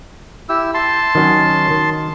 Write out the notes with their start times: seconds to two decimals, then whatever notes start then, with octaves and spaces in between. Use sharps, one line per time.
0.49 E4 G4 E6
0.74 A5 C6
1.15 D#3 F#3 C#4
1.71 D#3